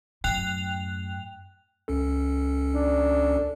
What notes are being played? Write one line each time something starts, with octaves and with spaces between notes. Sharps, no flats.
F#2 A2 G5 F#6 F7
C#2 C#4 A4
D4